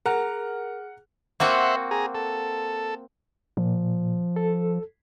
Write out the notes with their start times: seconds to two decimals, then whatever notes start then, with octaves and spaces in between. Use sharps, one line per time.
0.06 G#4 A#4 F#5 A#5 F6
1.40 A#3 C4 F#4 C5 E5 F#5
1.91 G#4 A#5
2.15 A4
3.57 A#2 F3
4.36 A4